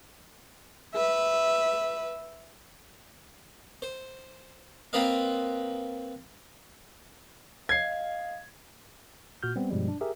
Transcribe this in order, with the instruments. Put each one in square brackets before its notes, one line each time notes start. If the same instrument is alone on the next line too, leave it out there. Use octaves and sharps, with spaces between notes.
[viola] B4 E5
[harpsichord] C5
A#3 C4 F4 B4 D#5 F5
[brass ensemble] D#5 F5 [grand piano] G#6 C7
[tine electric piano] A#2 F#4 F6 G6
G3 B3 C4
G2 B2 F3 G3 G#3
D4
G4 G#4 A#4 E5